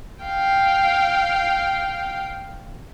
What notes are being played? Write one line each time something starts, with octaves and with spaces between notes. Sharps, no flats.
F5 G5